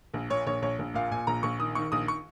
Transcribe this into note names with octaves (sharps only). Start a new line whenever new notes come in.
A#1
A#2 C#5
A#1 C#5
A#1 C#5
A#1
A#2 F5
A#2 G#5
A#1 A#5
A#1 C#6
D#3 D#6
D#3 C#6
A#1 D#6
C#6